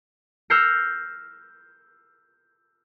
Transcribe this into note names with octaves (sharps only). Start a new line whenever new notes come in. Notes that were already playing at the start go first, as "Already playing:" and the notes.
E6 F6 G6 A#6 C7 C#7